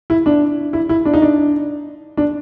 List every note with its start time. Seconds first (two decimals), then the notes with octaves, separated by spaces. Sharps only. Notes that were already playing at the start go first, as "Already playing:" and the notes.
0.10 E4
0.26 D4
0.73 E4
0.89 E4
1.05 D4
1.14 D#4
1.22 D4
2.17 D4